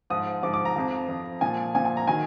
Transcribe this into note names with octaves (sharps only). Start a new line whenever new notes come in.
G#2 F3 D#6
G#2 F3 D6
D6
A#5
F2 F3
F2 F3
A#2 F3 G#5
A#2 F3 G#5
G#5
A#5
D#3 F#3 G#5